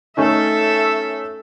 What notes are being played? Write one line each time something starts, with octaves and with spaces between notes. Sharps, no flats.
A3 C#4 D#4 A4 E5